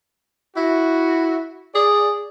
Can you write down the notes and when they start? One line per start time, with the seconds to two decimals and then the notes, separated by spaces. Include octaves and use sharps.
0.57 E4 F#4
1.75 G#4 D5